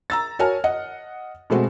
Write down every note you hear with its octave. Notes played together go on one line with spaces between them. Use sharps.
A#5 E6 A6
F#4 A#4 C#5 G#5 A5 F6
D#5 F#5
B2 G#3 A3 C4 F#4